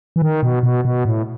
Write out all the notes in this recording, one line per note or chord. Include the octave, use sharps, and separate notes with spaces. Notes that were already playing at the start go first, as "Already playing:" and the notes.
E3
D#3
B2
B2
B2
A2